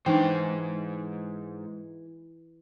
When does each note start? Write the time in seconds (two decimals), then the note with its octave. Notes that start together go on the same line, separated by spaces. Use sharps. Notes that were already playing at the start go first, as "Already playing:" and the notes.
0.06 G#2 E3 D4 D#4 C5 G5